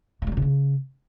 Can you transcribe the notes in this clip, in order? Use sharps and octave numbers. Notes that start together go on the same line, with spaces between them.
E3
G3
F#3
C3
C#3